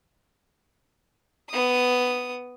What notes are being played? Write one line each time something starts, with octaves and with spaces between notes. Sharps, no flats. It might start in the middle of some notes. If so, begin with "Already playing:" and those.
B3 D#6